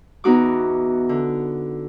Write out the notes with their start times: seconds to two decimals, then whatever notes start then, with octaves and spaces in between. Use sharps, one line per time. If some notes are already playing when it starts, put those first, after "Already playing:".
0.24 E2 B3 D#4 F#4 D6
1.09 D3